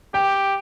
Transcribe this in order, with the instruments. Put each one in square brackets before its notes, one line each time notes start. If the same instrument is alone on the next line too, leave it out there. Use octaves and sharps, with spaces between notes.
[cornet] G4 [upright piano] G5